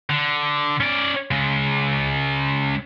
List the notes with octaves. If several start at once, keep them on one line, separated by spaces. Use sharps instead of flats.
D3
C#4 D5
C#3 G#3